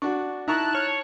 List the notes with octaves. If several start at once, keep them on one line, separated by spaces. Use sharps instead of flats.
D4 F#4 C#6
D#4 E4 A5 A#5 C#6 F#6
C#5 F6